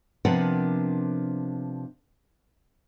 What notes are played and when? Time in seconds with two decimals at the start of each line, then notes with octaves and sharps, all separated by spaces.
0.25 C3 F3 B3 D4 A#4 F#5